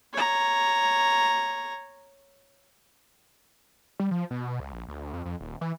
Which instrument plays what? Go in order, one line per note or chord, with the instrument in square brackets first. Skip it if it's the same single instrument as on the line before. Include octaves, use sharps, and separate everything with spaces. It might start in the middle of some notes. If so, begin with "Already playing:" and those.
[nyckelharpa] C#5 A#5
[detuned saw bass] G3
F3
B2
C#2
A#1
D2
F2
F2
D#1
E3